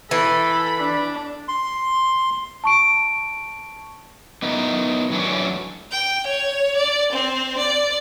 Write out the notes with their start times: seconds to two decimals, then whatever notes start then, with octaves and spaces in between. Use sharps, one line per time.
0.11 E3 A4 B5
0.79 D4
1.48 C6
2.64 A5 C#6 D7
4.42 B3 D#4 E4 A#4
5.10 F#2 E3 F#3 A3 C#4 D4
5.91 G5
6.27 C#5
6.77 D5
7.13 C4
7.58 D5